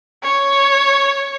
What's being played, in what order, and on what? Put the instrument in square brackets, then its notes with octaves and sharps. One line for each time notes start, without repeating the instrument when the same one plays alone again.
[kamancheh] C#5